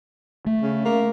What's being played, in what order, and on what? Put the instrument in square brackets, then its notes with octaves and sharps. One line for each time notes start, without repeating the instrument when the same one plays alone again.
[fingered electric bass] A3
[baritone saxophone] C#3
A#3